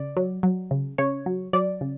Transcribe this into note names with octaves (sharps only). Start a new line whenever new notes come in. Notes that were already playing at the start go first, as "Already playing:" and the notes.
Already playing: C#3 D5
F#3
F#3
C#3
C#3 C#5
F#3
F#3 D5
C#3